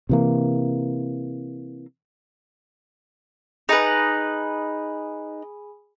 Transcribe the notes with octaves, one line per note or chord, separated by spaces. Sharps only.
C3 E3 A#3
D#4 G#4 B4 G#5 B5